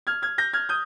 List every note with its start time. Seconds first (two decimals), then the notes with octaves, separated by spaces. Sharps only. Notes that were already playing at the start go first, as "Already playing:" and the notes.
0.07 F6 G#6
0.22 F6 G#6
0.38 G6 A#6
0.53 F6 G#6
0.69 D#6 G6